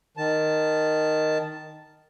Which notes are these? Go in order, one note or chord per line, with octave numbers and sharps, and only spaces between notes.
D#3 A5